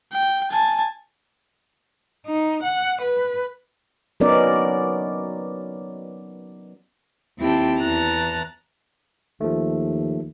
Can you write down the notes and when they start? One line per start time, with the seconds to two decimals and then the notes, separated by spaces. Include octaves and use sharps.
0.12 G5
0.51 G#5 A5
2.27 D#4
2.64 F#5
3.02 B4
4.20 F#3 B3 C#4 D#4 A#4 D5
7.39 D#2 C4 E4 G4 G5 A5
7.78 E2 E3 A5 A#5 F#6
9.41 D#2 F3 A3